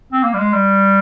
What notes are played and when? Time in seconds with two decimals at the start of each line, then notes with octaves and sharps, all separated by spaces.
0.13 C4
0.23 A#3
0.34 G3
0.39 G#3
0.53 G3